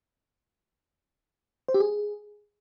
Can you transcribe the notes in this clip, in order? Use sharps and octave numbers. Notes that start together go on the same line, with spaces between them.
C5
G4
G#4